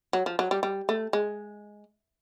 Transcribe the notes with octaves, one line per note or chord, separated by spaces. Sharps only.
F#3
F3
F#3
G3
G3
A3
G#3